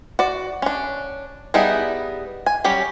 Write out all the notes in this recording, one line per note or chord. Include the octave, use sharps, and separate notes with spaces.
F#4 D5
C#4 D4
G3 B3 D#4 E4 G#4
G#5
F#3 G3 C#4 G4